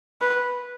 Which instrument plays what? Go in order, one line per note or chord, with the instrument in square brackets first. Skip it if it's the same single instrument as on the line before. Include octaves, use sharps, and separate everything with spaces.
[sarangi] B4